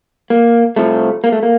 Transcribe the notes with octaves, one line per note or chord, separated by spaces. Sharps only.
A#3
C2 C3 F3 A3
A#3
A3
A#3